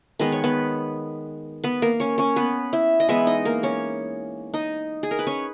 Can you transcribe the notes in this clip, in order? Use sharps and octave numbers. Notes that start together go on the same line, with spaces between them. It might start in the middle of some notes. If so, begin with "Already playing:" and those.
D#3 G#3 B3 B4
C#5
B3 B4
B3 B4
A#3 A#4
C#4 C#5
C#4 C#5
B3 B4
E4 E5
D#5
E3 G#3 B3 E4 E5
D#4 D#5
A#3 A#4
C#4 C#5
D#4 D#5
G#4
A#4
B4
C#4 C#5